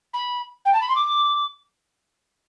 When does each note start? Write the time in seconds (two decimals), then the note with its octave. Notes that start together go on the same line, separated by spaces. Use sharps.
0.13 B5
0.65 G5
0.73 A5
0.81 B5
0.88 C6
0.95 D6